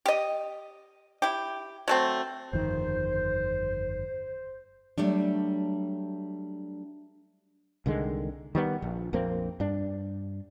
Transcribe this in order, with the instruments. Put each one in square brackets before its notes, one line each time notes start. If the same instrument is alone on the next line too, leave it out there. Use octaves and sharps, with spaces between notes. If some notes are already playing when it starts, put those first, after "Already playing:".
[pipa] G4 D#5
E4 G4
F#3 A3 C4
[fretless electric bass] G1 F2 D#3 [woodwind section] C5
[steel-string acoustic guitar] F#3 G3 A3 D4
[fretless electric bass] C2 D3 D#3 G#3
D#3 G3 B3
A#1
A#1 F2 A#3 C4
G2 D4